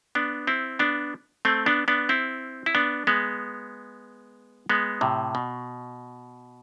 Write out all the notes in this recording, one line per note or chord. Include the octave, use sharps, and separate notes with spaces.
B3 D4
C4 E4
B3 D4
A3 C4
B3 D4
B3 D4
C4 E4
E4
B3 D4
G#3 B3
G#3 B3
A2 C3
B2